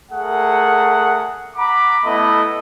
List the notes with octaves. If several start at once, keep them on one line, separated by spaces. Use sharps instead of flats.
A3 G#4 A#4 F#5
F#5 A#5 B5 D6
A3 B3 E4 D#5 B5